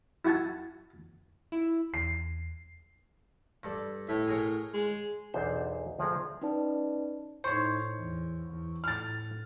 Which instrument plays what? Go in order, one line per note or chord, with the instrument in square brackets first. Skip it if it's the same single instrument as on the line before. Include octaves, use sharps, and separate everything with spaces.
[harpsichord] E4 F#4 F#5 G#5 A5
[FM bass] E4
[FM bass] E2 [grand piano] C7
[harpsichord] G2 A4 D5
[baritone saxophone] A2 [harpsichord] E5
[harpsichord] G#4 A#4 C#5
[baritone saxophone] G#3
[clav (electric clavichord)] B1 E2 D4 C5
D2 F3 G#4 F#5 A#5
[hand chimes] C#4 D#4 B4 D5 A5
[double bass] A2 D#4 [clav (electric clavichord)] C5 C#5 [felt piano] C#6
[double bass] E2
E2
[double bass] A2 [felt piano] F6 A6